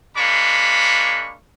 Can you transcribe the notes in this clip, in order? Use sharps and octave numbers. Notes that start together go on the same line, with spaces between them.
G#3 A#3 D4 B5 C#6